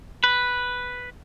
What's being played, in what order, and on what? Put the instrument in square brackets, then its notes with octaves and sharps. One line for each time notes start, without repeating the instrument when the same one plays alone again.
[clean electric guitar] B4